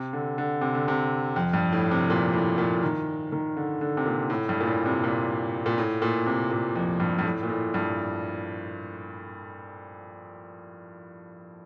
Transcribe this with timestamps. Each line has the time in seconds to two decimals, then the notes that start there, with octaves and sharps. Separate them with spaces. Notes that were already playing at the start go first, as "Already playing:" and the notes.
Already playing: C3
0.13 D3
0.38 D3
0.61 C3
0.75 D3
0.88 C3
1.36 F2
1.53 G2
1.72 A2
1.91 C3
2.10 A#2
2.33 A2
2.58 A#2
2.83 D#3
3.32 D#3
3.57 D3
3.81 D3
3.97 C3
4.06 A#2
4.30 A2
4.49 G2
4.60 A#2
4.67 A2
4.86 C3
5.04 A#2
5.66 A#2
5.78 A2
6.02 A#2
6.26 C3
6.51 A#2
6.76 F2
7.00 G2
7.19 G2
7.25 A2
7.43 A#2
7.49 A2
7.74 G2